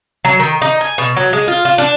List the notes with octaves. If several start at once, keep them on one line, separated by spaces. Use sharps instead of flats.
F#3
D#3
D#4
G#5
B2
F#3
G#3
F4
F4
D4